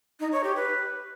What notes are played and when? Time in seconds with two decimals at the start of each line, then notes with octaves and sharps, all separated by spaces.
0.20 D#4
0.32 C#5
0.44 G4
0.56 B4